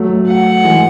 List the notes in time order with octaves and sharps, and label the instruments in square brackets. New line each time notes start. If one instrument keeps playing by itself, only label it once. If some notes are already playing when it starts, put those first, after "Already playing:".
Already playing: [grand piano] F#3 A3
[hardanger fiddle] F#5
[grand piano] E3 G#3